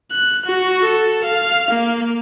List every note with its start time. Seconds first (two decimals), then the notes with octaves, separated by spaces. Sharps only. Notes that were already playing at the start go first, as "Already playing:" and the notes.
0.11 F#6
0.46 F#4
0.84 A4
1.24 F5
1.71 A#3